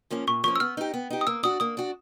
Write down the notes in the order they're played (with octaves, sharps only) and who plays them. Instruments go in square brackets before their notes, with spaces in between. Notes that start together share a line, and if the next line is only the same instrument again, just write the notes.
[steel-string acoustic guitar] F3 A#3 C#4
[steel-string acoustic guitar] A#2 [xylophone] C#6
[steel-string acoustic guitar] F3 A#3 C#4 [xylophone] C#6
[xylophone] E6
[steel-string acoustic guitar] B3 [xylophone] F6
[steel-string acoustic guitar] D#4 G4
B3
D#4 G4
[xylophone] D#6
[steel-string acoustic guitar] A#3 [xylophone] E6
[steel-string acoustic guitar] D4 F#4 [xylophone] D#6
[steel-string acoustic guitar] A#3 [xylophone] D#6
[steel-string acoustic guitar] D4 F#4